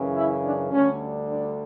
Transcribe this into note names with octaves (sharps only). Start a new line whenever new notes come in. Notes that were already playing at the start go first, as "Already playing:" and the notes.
Already playing: F#2 C#3 E3
E4
D4
D2 D3 G3 C#4
D4